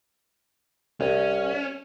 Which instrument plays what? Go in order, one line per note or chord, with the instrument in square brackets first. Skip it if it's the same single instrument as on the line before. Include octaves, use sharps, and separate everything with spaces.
[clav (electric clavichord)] C2 [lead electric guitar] C#4